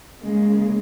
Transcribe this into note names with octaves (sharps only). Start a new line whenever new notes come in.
C#3 G#3 A#3